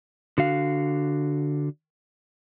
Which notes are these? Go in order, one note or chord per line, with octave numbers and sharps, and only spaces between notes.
D3 F#4 F5